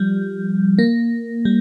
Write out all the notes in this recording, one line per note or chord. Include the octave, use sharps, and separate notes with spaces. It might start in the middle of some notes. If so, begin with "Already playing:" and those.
Already playing: F3 G3
A#3
G3